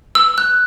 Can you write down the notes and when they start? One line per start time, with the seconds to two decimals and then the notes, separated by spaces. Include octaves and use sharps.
0.15 E6
0.38 F#6